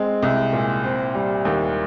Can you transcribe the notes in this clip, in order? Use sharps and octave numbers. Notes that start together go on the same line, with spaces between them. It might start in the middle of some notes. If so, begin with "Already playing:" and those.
Already playing: G#3 C4
C2
A#2
C4
G3
D#2